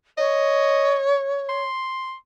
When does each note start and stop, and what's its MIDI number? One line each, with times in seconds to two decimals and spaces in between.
0.17 1.64 73
0.17 0.99 75
1.49 2.14 84